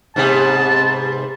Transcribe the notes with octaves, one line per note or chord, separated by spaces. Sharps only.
G#2 C3 B3 A5